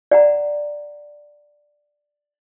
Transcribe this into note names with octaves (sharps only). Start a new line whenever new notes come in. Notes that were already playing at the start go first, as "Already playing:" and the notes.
D5 F#5 A#5